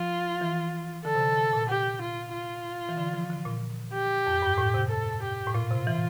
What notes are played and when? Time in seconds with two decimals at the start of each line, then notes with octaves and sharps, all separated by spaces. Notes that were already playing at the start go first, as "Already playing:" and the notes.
Already playing: F3 F4
0.41 E3
1.05 D3 A4
1.15 C3
1.20 D3
1.33 D3
1.37 C3
1.53 A#2
1.69 G4
2.01 F4
2.33 F4
2.89 E3
2.97 D3
3.14 F3
3.30 D3
3.45 A#2
3.94 G4
4.26 F2
4.42 G2
4.58 A2
4.74 C3
4.90 A4
5.22 G4
5.47 A2
5.54 A#2 F4
5.71 C3
5.87 E3